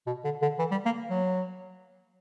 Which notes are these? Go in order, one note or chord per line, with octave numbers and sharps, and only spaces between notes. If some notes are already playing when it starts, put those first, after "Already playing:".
B2
D3
D3
E3
G3
A#3
F#3